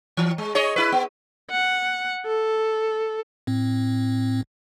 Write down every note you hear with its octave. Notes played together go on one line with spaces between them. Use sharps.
E3
G#3
G#4 C#5 D#5
E4 B4
B3
F#5
A4
A2 C4